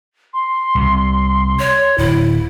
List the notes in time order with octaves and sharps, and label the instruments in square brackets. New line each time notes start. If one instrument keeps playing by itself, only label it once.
[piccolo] C6
[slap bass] C2 C3
[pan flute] C#5
[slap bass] D1 [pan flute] E4